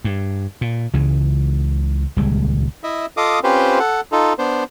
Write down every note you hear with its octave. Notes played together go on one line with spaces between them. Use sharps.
G2
A#2
C#2 C#3 E3
D#1 C#2 G3 G#3
E4 D#5 E5
F4 A4 D#5 F5 D6 D#6
C4 C#4 F4 G4 B4 C5
A4 F#5
D#4 F4 A4
B3 D4 C5